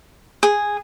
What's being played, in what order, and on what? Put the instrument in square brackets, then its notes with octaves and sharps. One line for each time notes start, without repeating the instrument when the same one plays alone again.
[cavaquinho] G#4